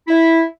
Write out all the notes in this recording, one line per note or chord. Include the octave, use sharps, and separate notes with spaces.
E4